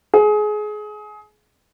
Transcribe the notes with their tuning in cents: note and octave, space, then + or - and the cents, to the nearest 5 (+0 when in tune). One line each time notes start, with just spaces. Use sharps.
G#4 +25